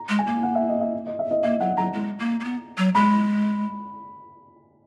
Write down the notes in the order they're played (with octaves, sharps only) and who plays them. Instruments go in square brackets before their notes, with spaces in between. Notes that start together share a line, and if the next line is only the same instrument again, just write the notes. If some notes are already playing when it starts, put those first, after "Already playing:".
Already playing: [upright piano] A#5
[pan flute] G#3
[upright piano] G#5
[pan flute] A#3
[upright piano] F#5
E5
D#5
E5
D#5
E5
D#5
[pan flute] A#3 [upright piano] E5
[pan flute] F#3 [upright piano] F#5
[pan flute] F#3 [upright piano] A#5
[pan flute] G#3
A#3
A#3
B3
F#3
[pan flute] G#3 [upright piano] B5